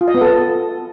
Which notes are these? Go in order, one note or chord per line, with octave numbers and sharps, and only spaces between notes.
F4
D#5
B3
A4